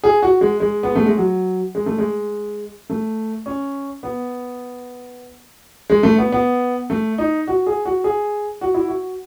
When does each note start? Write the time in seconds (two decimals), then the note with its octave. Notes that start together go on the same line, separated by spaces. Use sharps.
0.04 G#4
0.22 F#4
0.41 G#3
0.60 G#3
0.83 B3
0.95 A3
1.06 G#3
1.17 F#3
1.75 G#3
1.86 A3
1.98 G#3
2.90 A3
3.46 C#4
4.03 B3
5.90 G#3
6.03 A3
6.18 B3
6.32 B3
6.90 A3
7.18 D#4
7.48 F#4
7.67 G#4
7.85 F#4
8.04 G#4
8.61 F#4
8.74 E4
8.88 F#4